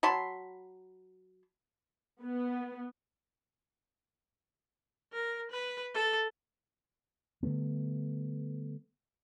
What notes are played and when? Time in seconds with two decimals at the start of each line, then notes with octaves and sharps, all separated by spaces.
0.03 F#3 A5 B5 C6
2.22 B3
5.13 A#4
5.51 B4
5.94 A4
7.43 D3 G3 A3 B3